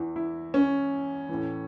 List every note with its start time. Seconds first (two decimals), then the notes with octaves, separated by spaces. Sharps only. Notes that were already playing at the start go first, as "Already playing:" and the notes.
Already playing: E2 E3
0.16 E4
0.54 C#4
1.29 E3
1.34 A2